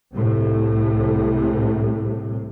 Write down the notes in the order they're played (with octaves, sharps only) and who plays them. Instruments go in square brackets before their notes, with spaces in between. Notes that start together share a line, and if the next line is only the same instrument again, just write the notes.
[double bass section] C2 A2 C3